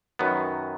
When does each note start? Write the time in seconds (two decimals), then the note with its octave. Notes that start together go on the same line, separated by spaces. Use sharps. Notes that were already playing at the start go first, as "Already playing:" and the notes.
0.19 F#2 D#3 F#3 B3